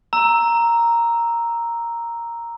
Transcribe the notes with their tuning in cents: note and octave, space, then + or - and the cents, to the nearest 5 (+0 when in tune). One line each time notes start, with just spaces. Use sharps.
A#5 +0 E6 +0